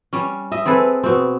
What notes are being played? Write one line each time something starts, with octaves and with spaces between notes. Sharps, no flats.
G3 C#4
D#5 E5
C4 G#4 A4 B4
B2 C4